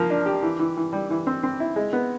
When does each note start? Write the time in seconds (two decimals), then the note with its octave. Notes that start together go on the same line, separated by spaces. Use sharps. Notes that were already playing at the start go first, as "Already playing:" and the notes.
Already playing: F3 A#3
0.10 D4
0.26 G4
0.43 E3
0.59 E3
0.77 E3
0.93 G3
1.10 E3
1.27 C4
1.43 C4
1.60 E4
1.76 G#3
1.93 B3